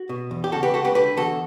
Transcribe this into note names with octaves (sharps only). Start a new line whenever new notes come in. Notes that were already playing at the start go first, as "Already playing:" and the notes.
Already playing: F#4
B2
E2
G4
C#3 F#4 A4
G4 B4
C#2 F#4 A4
G4 B4
D3 G4 B4
E2 F#4 A4